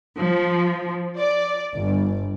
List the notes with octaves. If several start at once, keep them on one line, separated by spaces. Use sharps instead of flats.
F3
D5
G1